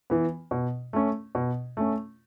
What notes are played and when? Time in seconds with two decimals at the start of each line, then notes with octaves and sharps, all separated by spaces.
0.10 E3 B3
0.51 B2
0.93 A3 C#4
1.35 B2
1.77 A3 C#4